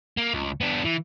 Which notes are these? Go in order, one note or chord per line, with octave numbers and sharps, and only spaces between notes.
A#3
C#2
B3 D4
E3